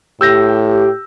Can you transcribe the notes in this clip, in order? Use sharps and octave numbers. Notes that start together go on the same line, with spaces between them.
A2 G4 E6 G6 A#6